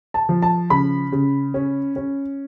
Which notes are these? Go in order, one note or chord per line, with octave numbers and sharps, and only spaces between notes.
A5
F3
A5
C#3 B5
C#3
C#4
C#4